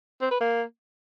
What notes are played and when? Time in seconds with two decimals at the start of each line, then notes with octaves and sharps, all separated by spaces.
0.21 C4
0.31 B4
0.41 A#3